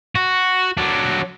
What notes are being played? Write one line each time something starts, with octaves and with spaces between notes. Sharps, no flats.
F#4
F#3 D4